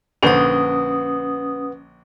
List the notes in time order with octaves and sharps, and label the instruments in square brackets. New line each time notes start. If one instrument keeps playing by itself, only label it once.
[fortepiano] A#1 D3 C5 [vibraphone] C#4 D#6 [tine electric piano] B4 F#5